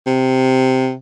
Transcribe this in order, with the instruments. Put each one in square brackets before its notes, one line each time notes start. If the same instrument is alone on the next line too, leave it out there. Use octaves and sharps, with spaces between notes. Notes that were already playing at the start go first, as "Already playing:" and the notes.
[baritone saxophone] C3